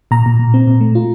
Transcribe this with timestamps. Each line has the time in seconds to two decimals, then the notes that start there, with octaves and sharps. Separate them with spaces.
0.11 A#2 A#5
0.26 A#2
0.39 A#2
0.54 C4
0.67 A#2
0.81 A3
0.95 F4